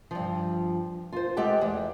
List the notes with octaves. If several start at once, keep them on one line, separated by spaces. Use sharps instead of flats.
G2 F3
F4 C5
G#3 G4 A4 F#5 G5
E2